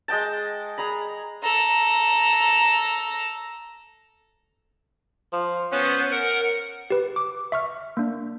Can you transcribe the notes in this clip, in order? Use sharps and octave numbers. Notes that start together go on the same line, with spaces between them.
G#3 D#5 G5 A5
G#4 A#5 B5
A4 A#5
F3
B3 C#4 B4 C5
A#4 F#5
G4 B4
D6
E5 C#6 F6
A#3 D4